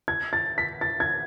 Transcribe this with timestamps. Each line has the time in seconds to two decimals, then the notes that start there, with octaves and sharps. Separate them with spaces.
0.08 G#6
0.33 A6
0.58 B6
0.81 A6
1.00 G#6